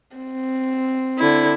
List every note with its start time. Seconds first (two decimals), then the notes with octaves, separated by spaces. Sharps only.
0.17 C4
1.18 D3 E4